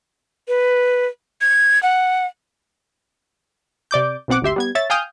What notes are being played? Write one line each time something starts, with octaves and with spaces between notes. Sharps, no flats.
B4
G#6
F#5
C3 D5 D6 G6
B1 B2 C4 F#5 D6
G#1 D2 G4 E5 C6
G3 B3 G#6
C#5 E5 A6
F5 G5 G#5 D#6 F6 G6